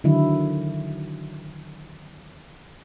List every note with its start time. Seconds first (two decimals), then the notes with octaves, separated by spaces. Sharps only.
0.04 D3 D#3 F#3 E4